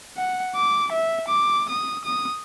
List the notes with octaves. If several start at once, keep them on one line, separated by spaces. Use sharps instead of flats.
F#5
D6
E5
D6
D#6
D#6